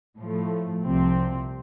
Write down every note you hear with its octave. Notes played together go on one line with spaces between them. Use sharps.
A2 F3 A3
C2 C3 F3 C4